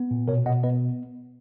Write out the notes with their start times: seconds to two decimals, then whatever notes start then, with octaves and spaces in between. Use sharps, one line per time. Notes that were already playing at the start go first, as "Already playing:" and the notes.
Already playing: B3
0.11 A#2
0.28 B2 A#4 C#5
0.46 B2 D#5 F#5
0.63 B3 B4 D#5